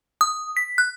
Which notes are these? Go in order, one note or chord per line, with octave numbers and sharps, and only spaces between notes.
D#6
B6
F#6